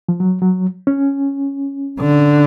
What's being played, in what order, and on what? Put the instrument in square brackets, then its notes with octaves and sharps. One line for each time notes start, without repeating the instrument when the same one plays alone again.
[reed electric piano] F3
F#3
F#3
C#4
[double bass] D3